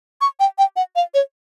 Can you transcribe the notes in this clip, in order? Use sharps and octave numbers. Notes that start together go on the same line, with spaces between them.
C#6
G5
G5
F#5
F5
C#5